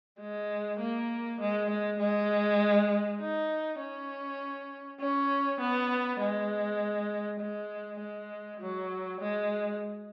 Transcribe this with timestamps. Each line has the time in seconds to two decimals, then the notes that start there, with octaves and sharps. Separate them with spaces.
0.20 G#3
0.80 A#3
1.40 G#3
1.70 G#3
1.99 G#3
3.21 D#4
3.79 C#4
5.00 C#4
5.60 B3
6.20 G#3
7.40 G#3
8.00 G#3
8.60 F#3
9.21 G#3